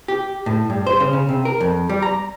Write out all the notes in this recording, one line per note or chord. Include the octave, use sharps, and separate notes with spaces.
G4
A2
G2
C5
C#3
C#3
C3
A#4
F2
G3
A#5